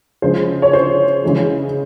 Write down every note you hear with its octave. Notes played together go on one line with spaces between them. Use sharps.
C#3 F3 G#3 C5
C#5
C5
C#3 E3 G#3